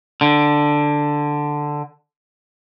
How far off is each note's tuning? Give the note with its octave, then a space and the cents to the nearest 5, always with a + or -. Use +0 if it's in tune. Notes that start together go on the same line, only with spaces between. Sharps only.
D3 +5